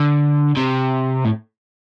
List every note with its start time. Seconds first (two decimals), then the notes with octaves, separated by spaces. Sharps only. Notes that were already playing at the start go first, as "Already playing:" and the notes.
Already playing: D3
0.57 C3
1.25 A2